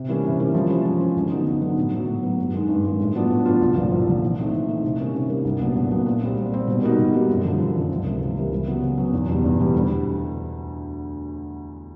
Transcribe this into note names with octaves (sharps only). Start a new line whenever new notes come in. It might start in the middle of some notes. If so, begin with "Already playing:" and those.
Already playing: C3
E3 G3 A#3 C#4
C3
E3 G3 A#3 C#4
F3
G#3 C#4
F3
G#3 C#4
D2
D3 F#3 B3 D#4
D2
D3 F#3 B3 D#4
A2
F#3 B3
A2
F#3 B3
G2
D#3 G#3
G2
D#3 G#3
A2
F#3 B3 D4 F4
A2
F#3 B3 D4 F4
C2
A#2 F3
C2
A#2 F3
E3
A3 C4 D#4
E3
A3 C4 D#4
C3
D#3 G3 A#3 C#4
C3
D#3 G3 A#3 C#4
C2
A#2 F#3 B3 D4
C2
A#2 F#3 B3 D4
A#2
G3 C4
A#2
G3 C4
B2
G3 A#3 D#4 F#4
B2
G3 A#3 D#4 F#4
F#2
D3 F3
F#2
D3 F3
C#2
C3 E3 G3 A#3
C#2
C3 E3 G3 A#3
C#3
F#3 B3
C#3
F#3 B3
E2
B2 G3
E2
B2 G3
D2